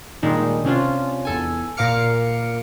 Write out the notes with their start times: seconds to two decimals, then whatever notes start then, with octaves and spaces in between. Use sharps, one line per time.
0.23 A#2 D#3 G3 G#3 D4 D#4
0.65 C3 C#4 D4 F4
1.25 E2 A4 G#5
1.77 A#2 A#4 F5 D6 F6 C#7